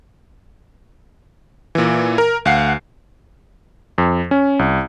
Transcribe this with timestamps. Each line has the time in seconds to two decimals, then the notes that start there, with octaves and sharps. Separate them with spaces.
1.75 A#2 E3
2.18 A#4
2.45 D2 F5 F#5 C7
3.98 F2
4.31 C#4
4.59 C2